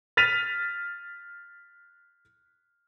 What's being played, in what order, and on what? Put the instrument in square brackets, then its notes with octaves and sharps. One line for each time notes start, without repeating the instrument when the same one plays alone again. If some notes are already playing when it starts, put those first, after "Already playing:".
[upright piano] F6 A6 B6 D#7 F7